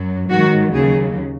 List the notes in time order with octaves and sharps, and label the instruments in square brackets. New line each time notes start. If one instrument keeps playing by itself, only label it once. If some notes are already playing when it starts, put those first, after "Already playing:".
Already playing: [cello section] F#2 F#3
G#2 D#3 F#3 F#4
D#2 C#3 F#3 G#4